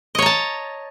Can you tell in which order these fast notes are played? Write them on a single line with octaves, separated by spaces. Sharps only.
D#5 C#5 A#5 A5